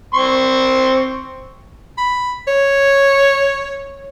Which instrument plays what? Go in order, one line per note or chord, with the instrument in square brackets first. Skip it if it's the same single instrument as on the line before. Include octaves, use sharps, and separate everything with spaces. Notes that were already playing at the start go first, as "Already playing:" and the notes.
[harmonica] C4 C6 C#6
[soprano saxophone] B5
C#5